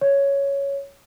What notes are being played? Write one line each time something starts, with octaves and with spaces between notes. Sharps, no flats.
C#5